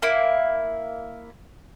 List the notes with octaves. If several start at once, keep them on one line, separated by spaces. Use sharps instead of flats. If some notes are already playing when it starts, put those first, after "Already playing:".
A#3 E4